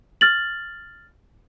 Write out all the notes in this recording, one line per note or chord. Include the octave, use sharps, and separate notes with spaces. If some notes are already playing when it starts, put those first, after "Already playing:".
F6 A6 F#7